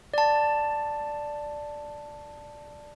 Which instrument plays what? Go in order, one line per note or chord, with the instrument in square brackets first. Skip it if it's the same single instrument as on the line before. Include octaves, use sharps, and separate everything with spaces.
[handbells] D5 A5